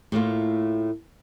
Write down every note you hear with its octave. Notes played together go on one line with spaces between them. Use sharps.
A2 A3 A#3 F4